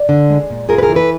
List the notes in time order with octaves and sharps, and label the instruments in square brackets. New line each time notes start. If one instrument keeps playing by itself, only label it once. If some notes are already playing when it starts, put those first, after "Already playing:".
Already playing: [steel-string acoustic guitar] D5
D3
G#3
A#2
F4 G#4 A#4
B4
G#4 A#4
E3
A4 B4